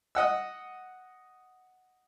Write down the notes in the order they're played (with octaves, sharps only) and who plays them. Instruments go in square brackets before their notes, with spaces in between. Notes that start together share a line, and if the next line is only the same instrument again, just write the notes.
[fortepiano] D#5 F#5 E6